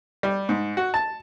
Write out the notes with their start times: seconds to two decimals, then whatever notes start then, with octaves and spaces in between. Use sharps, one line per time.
0.23 G3
0.49 G#2
0.77 F#4
0.94 A5